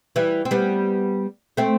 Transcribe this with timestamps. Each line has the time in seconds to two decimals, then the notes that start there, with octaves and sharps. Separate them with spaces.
0.16 E3 G3
0.45 C4
0.51 G3 B3
1.57 A3 C4